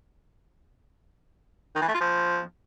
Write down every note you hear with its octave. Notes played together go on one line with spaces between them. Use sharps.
D#3
E3
A3
F4
F3